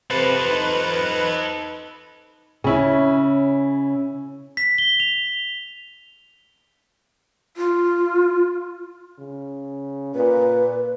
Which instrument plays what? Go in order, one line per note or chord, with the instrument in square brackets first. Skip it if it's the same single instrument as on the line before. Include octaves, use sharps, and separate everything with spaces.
[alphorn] C3 [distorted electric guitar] A4 C5 [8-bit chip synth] B4
[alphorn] D#4
[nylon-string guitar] C#3 [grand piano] C#4 E4
[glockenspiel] B6
G7
F7
[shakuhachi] F4
[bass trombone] C#3
[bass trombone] A#2 [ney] B4